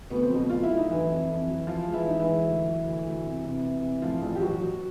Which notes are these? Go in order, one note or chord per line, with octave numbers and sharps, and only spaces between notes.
D2 B3
C4
B2 F#3 B3
D2 F4
E4
D2
D#4
E3 F#3 E4
F2
F2
F#3
F3 F4
G#3
E3 E4
G#3 D#4
E3 E4
G#3
D2
F#3
D2
D2
C3
C3
C3
C3
A2 F3 F4
A1
G4
A1 F#3 F#4
F#3